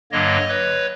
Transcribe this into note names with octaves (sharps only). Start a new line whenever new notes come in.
G2 D3 F#3 A#3 C#5 D#5
B4 C#5